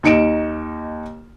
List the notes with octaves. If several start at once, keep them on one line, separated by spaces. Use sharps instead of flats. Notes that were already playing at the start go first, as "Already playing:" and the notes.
D#2 D#4 C#7 D7 E7